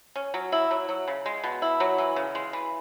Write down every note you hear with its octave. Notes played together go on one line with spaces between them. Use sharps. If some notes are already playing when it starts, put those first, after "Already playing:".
C#4
F#3
E4
F#3
F#3
C#3
G#3
B2
E4
F#3
E3
C#3
G#3
E3